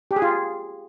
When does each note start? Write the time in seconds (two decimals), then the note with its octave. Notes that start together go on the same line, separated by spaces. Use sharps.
0.11 G4
0.16 G#4
0.22 F4